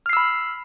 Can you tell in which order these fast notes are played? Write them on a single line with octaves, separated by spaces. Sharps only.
F6 C7 E6 B5